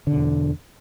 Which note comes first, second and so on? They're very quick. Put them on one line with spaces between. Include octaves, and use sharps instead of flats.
D3 B2 E2